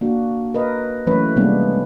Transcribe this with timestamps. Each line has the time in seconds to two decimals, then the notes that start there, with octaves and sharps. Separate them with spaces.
0.01 A#3 D4 F#4
0.54 A#4 B4 D#5
1.07 E3 F#3 A3 C#4 B4 C#5
1.36 C3 G3 G#3 A#3 B3 D4